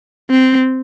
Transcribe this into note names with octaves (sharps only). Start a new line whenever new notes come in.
C4